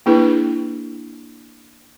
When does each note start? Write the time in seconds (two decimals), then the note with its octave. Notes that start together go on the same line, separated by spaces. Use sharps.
0.06 A#3 D4 E4 G#4 B4